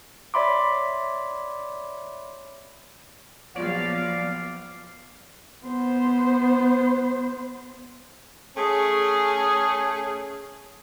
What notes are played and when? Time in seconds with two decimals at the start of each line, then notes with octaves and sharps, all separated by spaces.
0.34 C#5 D5 E5 B5 C6 D6
3.56 A#1 F3 F#3 B3 F4 C#5 D5 F5
5.66 B3 C5
8.56 A3 C#4 G#4